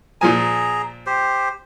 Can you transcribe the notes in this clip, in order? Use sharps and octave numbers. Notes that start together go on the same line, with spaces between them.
A#2 F3 G#4 G#5 A#5
G4 C5